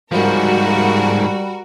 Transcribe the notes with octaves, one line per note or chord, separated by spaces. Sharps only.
G#2 F3 G3 F#4 A#4